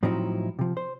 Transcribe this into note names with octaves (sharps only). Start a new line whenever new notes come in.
A2 F3 F#3 C4 D#4 E4
C3 F3
C5